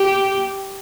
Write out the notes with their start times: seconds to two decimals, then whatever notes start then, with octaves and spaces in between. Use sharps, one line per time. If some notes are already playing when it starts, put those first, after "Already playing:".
Already playing: G4